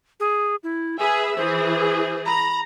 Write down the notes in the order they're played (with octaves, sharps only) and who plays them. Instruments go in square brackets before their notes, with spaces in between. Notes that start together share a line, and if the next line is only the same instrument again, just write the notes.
[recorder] G#4
E4
[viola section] G#4 B4 E5 [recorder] G#5
[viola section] E3 G#4 [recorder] C5
[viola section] A#5 [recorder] B5